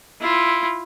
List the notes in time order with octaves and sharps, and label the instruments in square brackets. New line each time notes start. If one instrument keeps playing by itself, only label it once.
[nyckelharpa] E4 F4